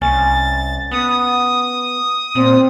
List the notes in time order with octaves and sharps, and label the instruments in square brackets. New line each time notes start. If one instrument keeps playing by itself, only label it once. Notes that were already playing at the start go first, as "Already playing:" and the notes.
[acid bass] C2 [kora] C#4 [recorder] A6
[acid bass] B3 [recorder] D#6
[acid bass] A#2 [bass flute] C4